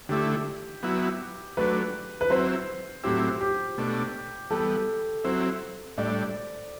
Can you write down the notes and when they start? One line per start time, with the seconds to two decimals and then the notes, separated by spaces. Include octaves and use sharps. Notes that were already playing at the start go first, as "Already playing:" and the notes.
0.09 D3 A3 E4 G4
0.83 F#3 B3 E4
1.57 F#3 A3 D4 B4
2.21 B4
2.30 F#3 C4 E4 C5
3.04 A2 F#3 C4 E4 G4
3.41 G4
3.78 B2 A3 D4
4.50 E3 G3 B3 A4
5.24 F#3 C4 E4 C5
5.98 A2 G3 D4 D5